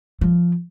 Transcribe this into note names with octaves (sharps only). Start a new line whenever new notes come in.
F3